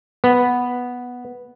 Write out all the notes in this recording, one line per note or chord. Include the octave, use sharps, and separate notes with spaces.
B3